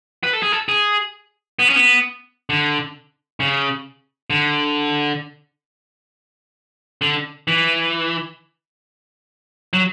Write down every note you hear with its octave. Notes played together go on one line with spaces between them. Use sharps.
B4
A4
G#4
A4
G#4
B3
C#4
B3
D3
C#3
D3
D3
E3
F#3